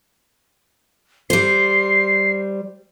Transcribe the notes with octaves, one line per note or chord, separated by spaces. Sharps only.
G3 C5 C7